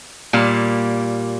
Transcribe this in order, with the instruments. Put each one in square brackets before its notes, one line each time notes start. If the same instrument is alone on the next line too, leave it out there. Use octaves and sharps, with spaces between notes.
[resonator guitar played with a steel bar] A#2 G3 A#3